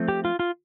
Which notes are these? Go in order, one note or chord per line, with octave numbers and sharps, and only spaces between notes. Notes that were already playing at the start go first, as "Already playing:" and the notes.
Already playing: F3 A3 C4
G4
F4
F4